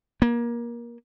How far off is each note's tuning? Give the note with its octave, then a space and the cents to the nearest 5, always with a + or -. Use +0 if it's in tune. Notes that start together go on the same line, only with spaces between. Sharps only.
A#3 +25